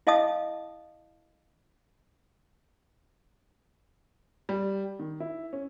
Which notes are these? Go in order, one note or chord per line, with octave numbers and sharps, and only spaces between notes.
E4 D#5 F5 A5 D#6
G3
D#3
E4
C#4